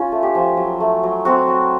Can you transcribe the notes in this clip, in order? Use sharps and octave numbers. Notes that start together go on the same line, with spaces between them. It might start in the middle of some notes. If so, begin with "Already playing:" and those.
Already playing: C#4 F4
A3
G4
F3
F#3
A3
F#3
C4 F#4
F#3